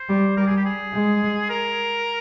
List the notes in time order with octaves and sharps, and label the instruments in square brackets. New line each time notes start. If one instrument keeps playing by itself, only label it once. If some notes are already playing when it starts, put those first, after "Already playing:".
Already playing: [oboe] C5
[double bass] G3
[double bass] G3 [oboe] A#4
[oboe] G#4
G4
G#4
[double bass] G#3
[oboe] A#4